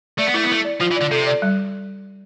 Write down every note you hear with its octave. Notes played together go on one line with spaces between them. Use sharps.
A3 D5
B3
A3 E4
B3
A3 E4
D5
F3 F4
E3
D3 D5
C3 A4
D5
G3